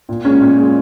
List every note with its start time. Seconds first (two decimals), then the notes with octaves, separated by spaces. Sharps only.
0.09 A#2
0.25 G#3 C#4
0.41 A#2
0.58 G#3